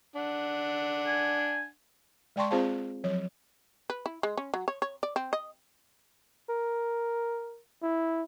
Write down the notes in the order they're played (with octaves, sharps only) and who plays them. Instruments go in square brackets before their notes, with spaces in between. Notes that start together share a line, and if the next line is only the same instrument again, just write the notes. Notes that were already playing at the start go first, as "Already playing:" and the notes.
[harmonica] D4 F#5
[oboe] G#5
[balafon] G#3 D5 G5 A5 C6 C#6
C4 F4 G#4 C5 F5 A5
F3 F#3 C#5
[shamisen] B4
E4
G#3
C#4
F#3
C#5
C#5
D5
C4
D#5
[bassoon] A#4
[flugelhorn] E4